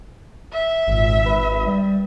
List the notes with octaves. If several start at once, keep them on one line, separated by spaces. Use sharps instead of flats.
E5
G#1 A#2
B4
G3